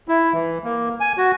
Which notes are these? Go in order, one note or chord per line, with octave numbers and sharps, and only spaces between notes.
E4
E3
A#3
G#5
F#4